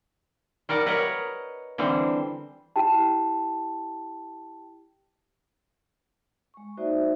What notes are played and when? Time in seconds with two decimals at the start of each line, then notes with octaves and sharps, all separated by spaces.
0.69 G3 A#4 D5 F#5
0.86 A#4 B4 C#5 D#5 F#5
1.78 D3 E3 G3 C4
2.76 E4 G4 G5 A5
6.54 G#3 C#6
6.77 A#3 D#4 F#4 C5 D5 E5